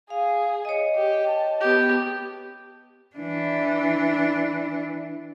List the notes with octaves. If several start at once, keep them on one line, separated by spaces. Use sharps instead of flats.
G#4 F5
C#5 D#5
G4
A5
B3 G4
E3 D4